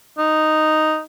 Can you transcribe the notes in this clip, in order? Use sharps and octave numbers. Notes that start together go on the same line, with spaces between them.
D#4